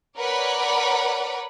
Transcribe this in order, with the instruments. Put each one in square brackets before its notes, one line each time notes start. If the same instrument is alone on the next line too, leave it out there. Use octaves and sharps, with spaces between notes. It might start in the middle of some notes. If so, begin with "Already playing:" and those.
[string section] A#4 B4 C#5 D5 F#5 B5